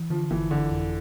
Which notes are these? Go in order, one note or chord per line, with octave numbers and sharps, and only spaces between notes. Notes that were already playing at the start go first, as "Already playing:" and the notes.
Already playing: E3
D3 F3
G1 E3
G1 D3
F2